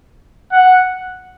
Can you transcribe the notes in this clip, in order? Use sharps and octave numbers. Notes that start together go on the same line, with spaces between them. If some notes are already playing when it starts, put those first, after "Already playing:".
F#5